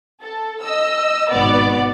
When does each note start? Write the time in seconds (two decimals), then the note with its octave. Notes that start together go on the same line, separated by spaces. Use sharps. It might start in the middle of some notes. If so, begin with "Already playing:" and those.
0.23 A4
0.62 D#5 E6
1.31 G#1 B2 B3 D5